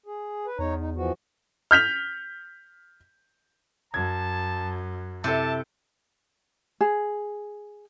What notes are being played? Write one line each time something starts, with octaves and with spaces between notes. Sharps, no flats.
G#4
B4
E2 D#4 C#5 A#5
D#4
E3 F3 F#4
F6 G6 B6 F7
F#2 A5 G#6
C3 E4 A4 A5
G#4